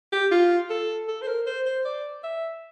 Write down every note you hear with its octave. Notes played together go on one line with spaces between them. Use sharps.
G4
F4
A4
A4
C5
A#4
C5
C5
D5
E5